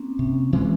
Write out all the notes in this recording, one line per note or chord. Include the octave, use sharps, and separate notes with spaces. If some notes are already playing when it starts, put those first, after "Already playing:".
Already playing: A#3 C4 C#4
C3 C#4
E3 G#3